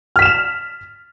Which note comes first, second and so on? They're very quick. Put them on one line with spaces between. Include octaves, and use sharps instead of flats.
F6 B6 E7 F7